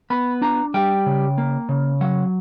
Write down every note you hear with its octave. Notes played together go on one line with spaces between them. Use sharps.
B3 B5
D4 A#5
G3 G5
C#3
A#3
C#3
F#3 F#5